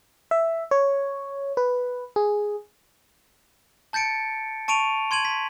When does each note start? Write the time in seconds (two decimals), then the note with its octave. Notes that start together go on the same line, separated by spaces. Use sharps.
0.31 E5
0.71 C#5
1.57 B4
2.16 G#4
3.93 A5 G6 A6 C#7 D7
4.68 A5 C#6 D7 D#7 F7
5.11 C6 G#6 D#7 F#7
5.25 B6